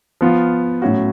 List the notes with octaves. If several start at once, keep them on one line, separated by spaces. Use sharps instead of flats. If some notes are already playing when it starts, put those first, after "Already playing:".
F3 B3 F4
A2 F#3 C#4 F#4